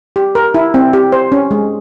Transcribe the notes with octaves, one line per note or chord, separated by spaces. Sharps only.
G4
A#4
E4
C4
G4
C5
C#4
G#3